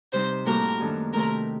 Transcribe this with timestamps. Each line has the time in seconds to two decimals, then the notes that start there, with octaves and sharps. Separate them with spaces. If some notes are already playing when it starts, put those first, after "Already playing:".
0.13 C3 G3 C4 D#4 C5
0.46 A2 G3 A#3 F#4 A#4 C5
0.80 F#2 D#3 A3 D4 A4
1.13 C3 D#3 A3 C4 A#4